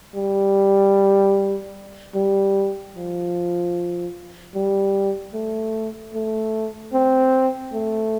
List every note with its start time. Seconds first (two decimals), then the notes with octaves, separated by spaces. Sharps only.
0.16 G3
2.15 G3
2.96 F3
4.55 G3
5.34 A3
6.15 A3
6.94 C4
7.73 A3